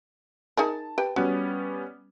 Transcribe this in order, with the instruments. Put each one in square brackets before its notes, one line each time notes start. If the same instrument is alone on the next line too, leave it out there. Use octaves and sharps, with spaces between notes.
[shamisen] D#4 G#4 A#4 [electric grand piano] A5
[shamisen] G4 B4 G5
[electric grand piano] G3 B3 C#4 [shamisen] F#4